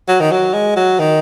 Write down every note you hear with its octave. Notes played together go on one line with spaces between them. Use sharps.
F#3
D#3
F#3
G#3
F#3
D#3